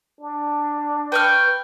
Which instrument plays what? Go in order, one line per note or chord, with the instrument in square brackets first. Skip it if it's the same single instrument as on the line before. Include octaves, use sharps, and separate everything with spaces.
[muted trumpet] D4
[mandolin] B4 C#6 F6 [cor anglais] G5